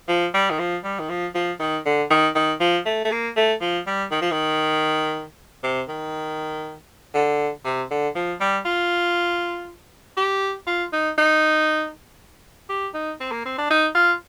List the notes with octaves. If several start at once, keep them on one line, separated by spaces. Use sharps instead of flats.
F3
G3
D#3
F3
G3
D#3
F3
F3
D#3
D3
D#3
D#3
F3
A3
A3
A#3
A3
F3
G3
D#3
F3
D#3
C3
D#3
D3
C3
D3
F3
G3
F4
G4
F4
D#4
D#4
G4
D#4
C4
A#3
C4
D4
D#4
F4